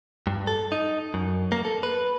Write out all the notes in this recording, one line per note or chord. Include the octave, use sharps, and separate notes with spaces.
G2
A4
D#4
F#2
A#3
A4
B4